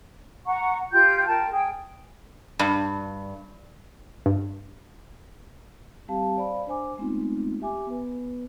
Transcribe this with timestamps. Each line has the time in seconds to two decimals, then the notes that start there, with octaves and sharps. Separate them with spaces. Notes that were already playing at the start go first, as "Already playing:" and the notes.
0.46 F#5 A#5 C#6
0.93 F4 G4 G5 G6
1.27 A#4 G5 A5
1.52 G#4 G5
2.59 G2
4.26 G2
6.08 G3 C4 G4 F5 A5
6.37 C5 D5 F5 B5
6.67 D4 C5 G#5 D6
6.98 G#3 A3 B3 C4 D#4 F4
7.61 G4 E5 G#5 D6
7.86 B3 B4